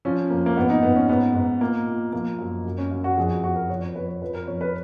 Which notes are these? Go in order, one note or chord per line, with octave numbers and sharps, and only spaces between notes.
F3 C#4
F2 A#3
A#3
G#2 B3
D#4
G#2 B3
C#4
G#2 B3
G#2
A#2 A#3
A#2
F3 A#3
F#2
F#2
C#4
F#2
F#4
F2 G#4
F#4
F2 F#4
A#4
F2 C#5
C#5
F2 B4
C#5
F3 B4
A#4
F2 C#5
B4